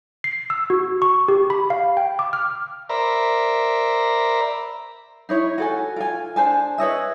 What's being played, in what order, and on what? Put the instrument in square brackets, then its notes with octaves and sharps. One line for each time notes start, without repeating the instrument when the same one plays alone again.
[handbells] C7
E6
F#4
C#6
G4
B5
F5
G5
D6
F6
[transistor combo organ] A#4 C5 D5 E5 A#5 B5
[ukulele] D#4 E4 C#5
F#4 A4 G#5
F4 G#5
D4 C5 G#5 A5
B4 C#5 D#5 E5